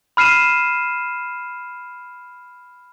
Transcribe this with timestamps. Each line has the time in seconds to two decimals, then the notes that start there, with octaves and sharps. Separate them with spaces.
0.17 B5 F6 C7 D#7 E7